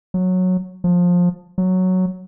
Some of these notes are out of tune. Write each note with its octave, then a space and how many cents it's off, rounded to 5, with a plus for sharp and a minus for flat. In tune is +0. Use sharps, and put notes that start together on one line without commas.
F#3 -10
F3 +20
F#3 +0